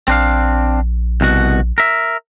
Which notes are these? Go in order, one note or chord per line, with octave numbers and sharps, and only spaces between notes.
A#1 C4 D4 F5
C2 B2 F#4
A#4 E5